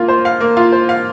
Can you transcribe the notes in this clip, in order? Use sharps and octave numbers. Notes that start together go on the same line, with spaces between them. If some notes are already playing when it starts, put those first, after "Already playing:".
Already playing: A#3 F4
C5
F5
A#3
F4
C5
F5